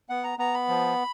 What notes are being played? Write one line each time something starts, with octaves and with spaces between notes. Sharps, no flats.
B3 F#5
A#5
B3 A#5
B5
F3